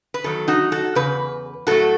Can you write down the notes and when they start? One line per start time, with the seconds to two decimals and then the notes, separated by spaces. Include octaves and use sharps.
0.14 B4
0.24 E2 D#3 F#3 A4
0.48 D#4 F#4
0.72 F#4 A4
0.95 E2 C#3 B4
1.67 A2 F#3 A3 F#4 A4